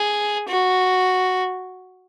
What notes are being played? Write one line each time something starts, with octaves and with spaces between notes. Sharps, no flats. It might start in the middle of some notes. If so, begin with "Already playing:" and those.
Already playing: G#4
F#4